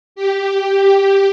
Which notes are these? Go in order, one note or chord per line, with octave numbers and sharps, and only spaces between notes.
G4